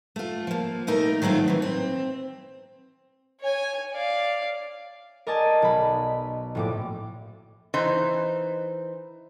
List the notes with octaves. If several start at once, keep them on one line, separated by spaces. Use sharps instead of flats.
A3 F4
F3 A#3
A#2 A3 D#4 A#4
D#3 F#3 A3 C4 F4
A#2 E3
C4
C#5 G#5
D5 F5
A#4 D5 D#5 G#5 A5
B1 B5
A#1 A2 D6
E3 D#4 C5